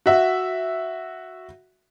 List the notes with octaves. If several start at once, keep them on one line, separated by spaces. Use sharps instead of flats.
F#4 E5